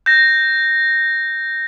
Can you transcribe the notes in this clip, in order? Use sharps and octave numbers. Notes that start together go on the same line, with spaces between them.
G6 A#6